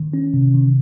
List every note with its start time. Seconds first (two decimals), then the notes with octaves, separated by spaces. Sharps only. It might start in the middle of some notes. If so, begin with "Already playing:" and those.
Already playing: D#3
0.14 C#4
0.34 C3
0.54 D#3